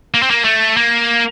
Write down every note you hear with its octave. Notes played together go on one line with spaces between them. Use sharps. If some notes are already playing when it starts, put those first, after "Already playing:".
A#3
C4
A#3
A3
A#3